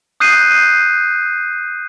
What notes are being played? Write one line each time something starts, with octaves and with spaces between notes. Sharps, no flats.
D#6 F#6 G6 C7 D#7